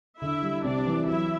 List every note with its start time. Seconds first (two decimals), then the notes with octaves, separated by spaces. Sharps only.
0.21 D3 E4 E5
0.43 G3
0.64 C3 D4 D5
0.87 E3
1.07 F#3 E4 E5